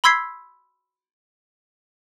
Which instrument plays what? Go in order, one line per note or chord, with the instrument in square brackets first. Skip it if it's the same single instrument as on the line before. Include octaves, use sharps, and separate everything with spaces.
[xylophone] B5 C6 E6 G#6 B6 C7